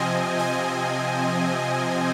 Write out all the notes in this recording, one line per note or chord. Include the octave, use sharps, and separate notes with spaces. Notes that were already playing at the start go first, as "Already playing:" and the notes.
Already playing: C3 F3 C4 D#5 G#5
D#5 G#5